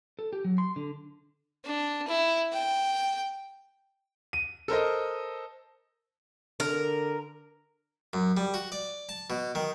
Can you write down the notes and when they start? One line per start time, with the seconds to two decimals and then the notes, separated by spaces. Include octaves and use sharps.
0.19 A4
0.33 G4
0.45 F#3
0.58 C6
0.76 D3
1.64 D4
2.07 E4
2.53 G5
4.33 D#7
4.68 A4 A#4 C5 D#5
6.60 D3 A#4
8.13 F#2
8.37 G3
8.54 F#4
8.72 D5
9.09 A5
9.30 B2
9.55 D#3